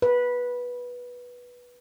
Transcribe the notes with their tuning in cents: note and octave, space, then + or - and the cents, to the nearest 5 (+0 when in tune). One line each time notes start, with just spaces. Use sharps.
B4 -10